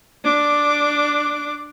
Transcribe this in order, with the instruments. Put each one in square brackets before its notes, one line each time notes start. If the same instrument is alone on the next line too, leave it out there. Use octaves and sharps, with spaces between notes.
[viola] D4 D6